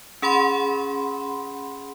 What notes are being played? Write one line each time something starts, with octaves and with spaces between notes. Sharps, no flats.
C#4 G#4 F#5 B5 C6